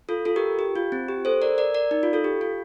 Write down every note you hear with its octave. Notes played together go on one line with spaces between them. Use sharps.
F4 A4
F4 A4
G4 A#4
G4
F4
C4
G4
A4 C5
A#4 D5
A#4 D5
A#4 D5
D#4
F4
F4 A4
G4
F4